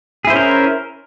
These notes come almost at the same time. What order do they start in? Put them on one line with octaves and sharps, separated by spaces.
G#4 E4 C5 C#4 A#4